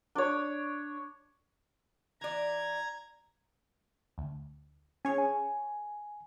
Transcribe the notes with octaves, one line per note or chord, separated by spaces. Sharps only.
D4 C#5
E3 D5 A#5 G#6
D2
C#4 G#4 C#5
G#5